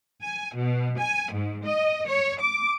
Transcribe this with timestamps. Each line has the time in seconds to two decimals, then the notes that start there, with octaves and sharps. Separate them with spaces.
0.22 G#5
0.55 B2
0.99 G#5
1.32 G#2
1.65 D#5
2.08 C#5
2.41 D6